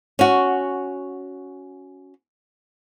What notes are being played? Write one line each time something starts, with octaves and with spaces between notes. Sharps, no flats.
C#4 F#4